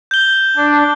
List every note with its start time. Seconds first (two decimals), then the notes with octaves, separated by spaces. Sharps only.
0.11 G6 G7
0.57 D4